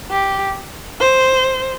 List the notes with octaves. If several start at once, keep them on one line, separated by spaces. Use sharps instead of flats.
G4
C5